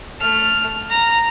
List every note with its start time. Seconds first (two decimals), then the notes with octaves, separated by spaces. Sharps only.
0.19 A3 F6
0.90 A#5